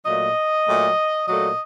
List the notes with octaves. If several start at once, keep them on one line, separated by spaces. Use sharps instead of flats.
A#2 F#3 A3 D#5
A#2 F#3 A3
A#2 F#3 A3 D#5